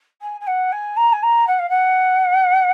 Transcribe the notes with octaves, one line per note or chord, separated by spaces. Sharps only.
G#5
G#5
F#5
G#5
A#5
G#5
A#5
F#5
F5
F#5